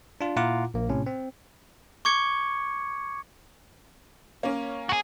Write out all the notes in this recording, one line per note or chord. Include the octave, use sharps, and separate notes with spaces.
D4 F4
A#2 E4 F4 F#5 A#5 D6
A#1 A#3
A2 C3 C#4
C4
C#6 D6 G#6 C#7
A#3 C#4
F#4 G#4